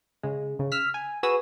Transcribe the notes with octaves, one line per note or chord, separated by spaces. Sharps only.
C#3 G#3
C#3
E6 F6 B6
G#5
F#4 G#4 B4 D#6 E6